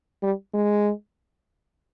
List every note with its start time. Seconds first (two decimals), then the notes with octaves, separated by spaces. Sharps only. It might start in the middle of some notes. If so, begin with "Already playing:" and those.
0.22 G3
0.53 G#3